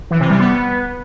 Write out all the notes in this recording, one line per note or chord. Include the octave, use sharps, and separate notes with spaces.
E3
C3
G3
B3